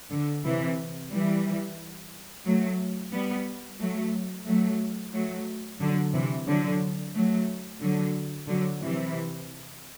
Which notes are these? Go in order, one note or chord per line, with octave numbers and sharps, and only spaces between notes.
D3
C3 E3
E3 G3
F#3 A3
G3 B3
F#3 A3
F#3 A3
F#3 A3
D3 F#3
C3 E3
D3 F#3
F#3 A3
D3 F#3
D3 F#3
C3 E3